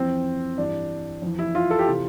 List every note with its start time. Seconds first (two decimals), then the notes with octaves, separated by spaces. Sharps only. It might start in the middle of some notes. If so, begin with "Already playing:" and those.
Already playing: F2 E3 C4
0.57 G2 E3 D4
1.22 F2 E3
1.39 E4
1.55 F4
1.70 A4
1.79 G4
1.87 C3 E3 F4